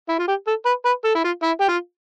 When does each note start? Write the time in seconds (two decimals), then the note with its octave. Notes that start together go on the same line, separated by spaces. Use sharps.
0.09 E4
0.19 F4
0.28 G4
0.47 A4
0.66 B4
0.85 B4
1.05 A4
1.15 E4
1.24 F4
1.43 E4
1.60 G4
1.68 F4